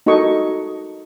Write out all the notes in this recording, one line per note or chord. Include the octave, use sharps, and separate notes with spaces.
D#4 F#4 A4 D#5 C#6